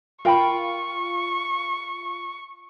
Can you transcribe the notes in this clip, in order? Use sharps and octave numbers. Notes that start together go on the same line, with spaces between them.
F4 A#4 G5 B5 C#6